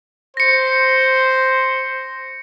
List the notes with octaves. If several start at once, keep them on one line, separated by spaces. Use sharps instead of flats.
C5 A#6 C#7